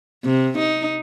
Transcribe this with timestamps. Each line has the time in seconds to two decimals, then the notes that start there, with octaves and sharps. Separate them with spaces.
0.24 C3
0.58 D#4